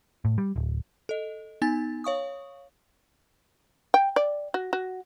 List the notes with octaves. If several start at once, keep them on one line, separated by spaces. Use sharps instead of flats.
A2
G3
D1
A4 D#5
B3 D#4 G#5 A6
C#5 F5 C#6 D#6
G5
D5
F#4
F#4